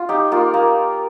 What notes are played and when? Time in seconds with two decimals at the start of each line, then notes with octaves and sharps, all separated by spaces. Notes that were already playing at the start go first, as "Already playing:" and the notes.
Already playing: F4
0.09 D#4 G4
0.32 A#3 F4
0.54 A#3